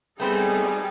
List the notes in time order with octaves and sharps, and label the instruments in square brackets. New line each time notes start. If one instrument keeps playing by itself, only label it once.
[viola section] G3 D#4 A4 [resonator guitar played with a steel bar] A3 B3 C4 [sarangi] G#4 [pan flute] G5